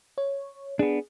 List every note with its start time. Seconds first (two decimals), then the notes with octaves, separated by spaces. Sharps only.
0.18 C#5
0.79 B3 D4 G#4